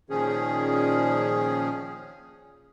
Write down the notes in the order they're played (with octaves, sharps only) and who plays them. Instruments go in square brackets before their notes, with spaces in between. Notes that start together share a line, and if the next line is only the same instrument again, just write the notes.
[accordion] A#2 D#3 F3 C#4 G#4